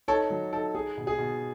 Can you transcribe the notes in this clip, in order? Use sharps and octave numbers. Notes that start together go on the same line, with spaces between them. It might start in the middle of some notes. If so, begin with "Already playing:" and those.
D#4 A4 C#5
F#3
D#4 A4
D#4 G#4
B2
G#4
B2